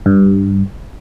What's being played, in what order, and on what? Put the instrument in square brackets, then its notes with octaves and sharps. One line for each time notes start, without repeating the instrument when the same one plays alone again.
[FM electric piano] G2